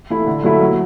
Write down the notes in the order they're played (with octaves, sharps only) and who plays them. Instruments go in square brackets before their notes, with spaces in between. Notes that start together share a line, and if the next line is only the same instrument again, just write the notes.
[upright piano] E3 A3 E4
D3
F#3 A3 E4 A4
F#3